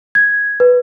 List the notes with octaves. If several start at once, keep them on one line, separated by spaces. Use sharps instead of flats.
G#6
B4